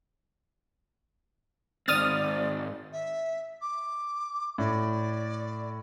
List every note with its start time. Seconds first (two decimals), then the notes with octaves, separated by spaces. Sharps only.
1.88 G#2 D#3 C4 D5 D#6 F6 A6
2.92 E5
3.61 D6
4.58 A2 D5